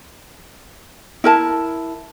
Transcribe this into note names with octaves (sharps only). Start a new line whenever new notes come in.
E4 A#4 A5